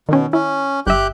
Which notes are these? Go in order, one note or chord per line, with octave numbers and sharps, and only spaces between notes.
B2 D#3 C#4
C#4 E4
G1 G4 E5 F#6 G6